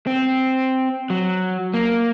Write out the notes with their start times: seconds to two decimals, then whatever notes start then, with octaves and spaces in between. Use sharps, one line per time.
0.07 C4
1.10 F#3
1.74 A#3